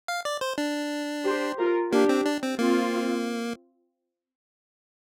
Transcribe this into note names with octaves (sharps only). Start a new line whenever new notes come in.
F5
D5
C5
D4
G4 C5
F4 A#4
A#3 D4 G4
C4
D4
C4
A#3 C4 F4